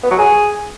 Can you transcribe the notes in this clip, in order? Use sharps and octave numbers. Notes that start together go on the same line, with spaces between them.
B3
F#3
G#4